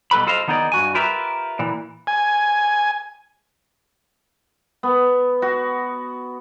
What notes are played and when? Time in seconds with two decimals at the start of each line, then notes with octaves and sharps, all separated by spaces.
0.11 B2 G3 A4 B4 B5
0.26 F4 A4 C5 D#5 F5
0.48 D#3 B3 D#4 G#4 D5
0.72 G2 F#4 G#5
0.94 F4 G4 A#4 B4 E5
1.59 A#2 E3
2.07 G#5
4.83 B3
5.42 F#4